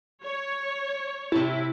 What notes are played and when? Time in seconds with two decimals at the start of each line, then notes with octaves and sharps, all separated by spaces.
0.24 C#5
1.32 C3 E4 A5